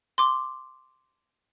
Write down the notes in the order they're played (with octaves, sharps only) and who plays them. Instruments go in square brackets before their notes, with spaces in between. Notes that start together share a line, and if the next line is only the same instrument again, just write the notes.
[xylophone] C6 D6